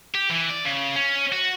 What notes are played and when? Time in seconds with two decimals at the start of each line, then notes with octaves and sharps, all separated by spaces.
0.14 G4
0.30 E3
0.50 D5
0.65 C#3
0.96 C#4
1.33 F#4